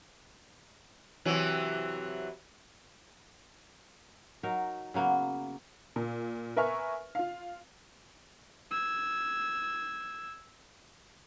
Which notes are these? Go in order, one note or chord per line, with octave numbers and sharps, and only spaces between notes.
C3 E3 F#3
F#3 D#4 A#4
C#3 F#3 A#3 B3
A#2
A#4 B4 E5 G#5 C#6 F6
F4 F5
E6 G#6